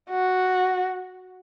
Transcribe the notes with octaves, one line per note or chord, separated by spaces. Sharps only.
F#4